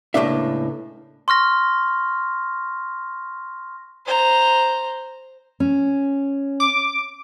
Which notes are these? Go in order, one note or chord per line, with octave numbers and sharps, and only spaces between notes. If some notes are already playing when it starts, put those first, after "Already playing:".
C#2 A2 A#3 D4 E5
C6 C#6 F6 A#6
C5 A#5
C#4
D6